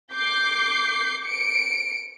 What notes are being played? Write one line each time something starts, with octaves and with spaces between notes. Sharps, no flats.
D6 G6 C7
C#7 D7